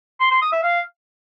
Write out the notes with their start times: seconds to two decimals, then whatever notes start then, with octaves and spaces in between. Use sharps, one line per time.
0.20 C6
0.31 C6
0.42 D#6
0.52 E5
0.63 F5